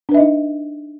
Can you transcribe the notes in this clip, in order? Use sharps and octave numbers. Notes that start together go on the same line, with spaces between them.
D4 D#4 B4 D#5 E5